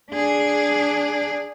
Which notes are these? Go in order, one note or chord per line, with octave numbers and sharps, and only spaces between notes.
D4 G#4